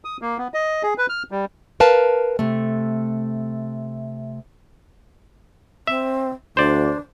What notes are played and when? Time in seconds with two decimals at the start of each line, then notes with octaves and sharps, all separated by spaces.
0.05 D#6
0.22 A#3
0.38 B3
0.54 D#5
0.83 G#4
0.98 B4
1.09 F6
1.31 G3
1.80 A#4 B4 F5 A5
2.39 C3 A3
5.87 C4 E5
6.57 D2 D4 C5 D5